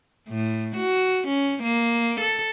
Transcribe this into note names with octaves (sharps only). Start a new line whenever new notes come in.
A2
F#4
C#4
A#3
A4